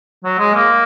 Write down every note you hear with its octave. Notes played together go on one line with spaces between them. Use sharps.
F#3
G#3
A#3